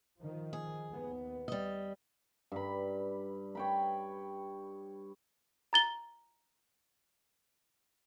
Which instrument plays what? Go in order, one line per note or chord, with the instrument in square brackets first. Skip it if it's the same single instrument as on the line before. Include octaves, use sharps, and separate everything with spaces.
[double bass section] D#3 F3
[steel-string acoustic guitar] G#4
[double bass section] D#2 B3
[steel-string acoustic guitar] G3 D#5
[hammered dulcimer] G2 B5
C#5 G5 B5
[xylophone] A#5 A6 G7